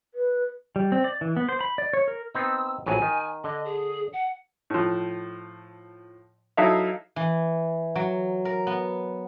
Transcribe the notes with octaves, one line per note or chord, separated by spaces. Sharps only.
B4
G3
C4
D5
E3
B3
C5
B5
D5
C#5
A#4
B3 C4 D#4 E6
A#1 A2 F#3 G#5
D#3
D3 D#5
G#4
F#5
A2 F3
F#3 D#4 E4 A4 E5 F5
E3
F#3
A#4
B3